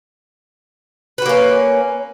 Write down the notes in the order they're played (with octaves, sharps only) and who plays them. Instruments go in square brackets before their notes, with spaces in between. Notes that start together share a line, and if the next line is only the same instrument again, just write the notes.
[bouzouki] B4
F#4
A#3
C#4